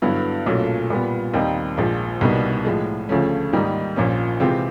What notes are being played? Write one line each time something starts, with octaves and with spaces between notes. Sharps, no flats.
G2 D3 F#3 B3 E4
B1 A#2 F#3 A3 C#4
A#2 G3 B3
D#2 D#3 G3 C4 D#4
A#1 A#2 F3 G#3
C2 B2 G3 A#3 D#4
A2 F3 G#3
D2 C#3 F3 A3 C#4
G#2 D#3 G3 A#3 D#4
A#1 A#2 F3 A#3 C#4
C3 E3 G#3 C4 F4